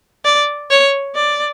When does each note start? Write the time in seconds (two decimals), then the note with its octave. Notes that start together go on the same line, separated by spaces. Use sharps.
0.25 D5
0.70 C#5
1.15 D5